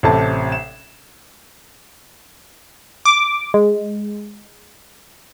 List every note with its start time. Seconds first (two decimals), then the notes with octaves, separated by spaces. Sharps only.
0.03 A1 C3 A4 A5
0.52 E7
3.05 D6
3.54 G#3